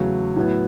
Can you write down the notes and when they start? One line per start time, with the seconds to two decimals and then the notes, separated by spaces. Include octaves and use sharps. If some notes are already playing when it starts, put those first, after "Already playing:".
Already playing: E2 C#3 F#3 A3 C#4
0.36 A2 F#3 B3 E4